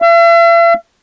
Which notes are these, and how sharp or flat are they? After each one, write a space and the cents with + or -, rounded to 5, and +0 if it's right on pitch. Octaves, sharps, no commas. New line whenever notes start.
E5 +45